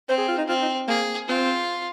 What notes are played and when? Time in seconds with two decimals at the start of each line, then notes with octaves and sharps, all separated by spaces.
0.09 C4 C5
0.18 G#4
0.28 F4
0.38 D#4
0.48 C4 F4
0.61 D#4
0.88 A#3 G#4
1.28 C4 F4